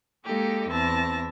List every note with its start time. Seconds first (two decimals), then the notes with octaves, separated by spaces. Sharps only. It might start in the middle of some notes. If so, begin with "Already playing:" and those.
0.25 G#3 A#3 D#4 G4 A4
0.70 E2 C4 E5 A5 A#6